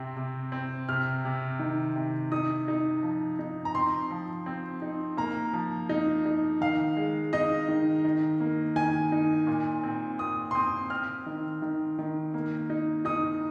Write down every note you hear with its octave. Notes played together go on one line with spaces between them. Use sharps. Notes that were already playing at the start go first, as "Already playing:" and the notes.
Already playing: C3 C4
C3
C4
C3 F6
C3
D#3
C3
D#4 D#6
D#4
F3
D#4
A#5
C4 C6
F3
C4
D#4
A#3 A#5
F3
D#4
D#4
D#3 F5
G#3
D#4 D#5
D#3
D#3
A#3
D#3 G#5
D#4
A#2
C4
A#2 D#6
C6
C4 D#6
C4 F6
D#3
D#3
D#3
A#3
D#4
D#4 D#6